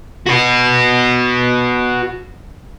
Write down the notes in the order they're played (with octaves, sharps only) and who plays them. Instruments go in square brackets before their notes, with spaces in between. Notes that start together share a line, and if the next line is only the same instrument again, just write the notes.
[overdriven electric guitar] F#4 B4